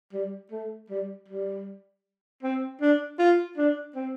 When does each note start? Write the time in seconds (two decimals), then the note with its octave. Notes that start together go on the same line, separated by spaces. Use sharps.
0.13 G3
0.52 A3
0.90 G3
1.28 G3
2.43 C4
2.81 D4
3.19 F4
3.58 D4
3.95 C4